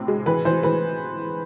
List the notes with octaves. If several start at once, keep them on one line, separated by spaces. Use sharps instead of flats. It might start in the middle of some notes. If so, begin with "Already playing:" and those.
Already playing: A2 C3 C4
G#3
E3 B4
E3 C5
E3 B4